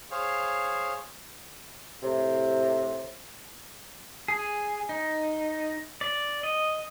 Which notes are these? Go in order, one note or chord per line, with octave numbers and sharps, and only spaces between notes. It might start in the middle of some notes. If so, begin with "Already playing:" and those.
G#4 C5 C#5 F5
A2 C3
G#4
D#4
D5
D#5